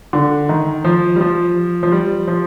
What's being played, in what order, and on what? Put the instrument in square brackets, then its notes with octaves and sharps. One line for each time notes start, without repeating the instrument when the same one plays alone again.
[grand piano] D3
D#3
F3
G3
F3
F3
G3
F3